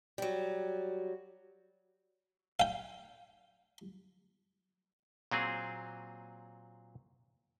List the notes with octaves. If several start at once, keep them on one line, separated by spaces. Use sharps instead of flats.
F#3 G3
F5 G5
A#2 F#3 C4 G#4